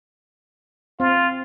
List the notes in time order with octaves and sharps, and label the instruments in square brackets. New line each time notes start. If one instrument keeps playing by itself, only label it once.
[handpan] C4 [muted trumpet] F4